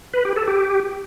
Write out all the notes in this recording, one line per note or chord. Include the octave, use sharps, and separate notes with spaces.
B4
G4
A4
G4